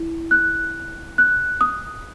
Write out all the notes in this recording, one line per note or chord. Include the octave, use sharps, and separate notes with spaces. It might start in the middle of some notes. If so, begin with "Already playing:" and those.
Already playing: E4
F#6
F#6
D#6